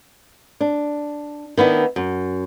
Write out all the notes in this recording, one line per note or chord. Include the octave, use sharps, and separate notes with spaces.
D4
D#3 B3 D4 E4
F#2